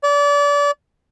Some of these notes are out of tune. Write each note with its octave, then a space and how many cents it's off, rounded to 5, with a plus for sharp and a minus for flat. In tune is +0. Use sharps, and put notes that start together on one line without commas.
D5 -30